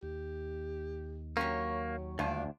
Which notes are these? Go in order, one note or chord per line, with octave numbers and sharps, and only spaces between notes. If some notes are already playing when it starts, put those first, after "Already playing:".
D#2 G4
F#3 A#3 C#4 G4 C#5
D2 G2 D4 F4